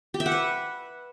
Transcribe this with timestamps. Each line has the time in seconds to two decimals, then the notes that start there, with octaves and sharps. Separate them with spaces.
0.14 G4
0.20 E5
0.26 F#5
0.32 B4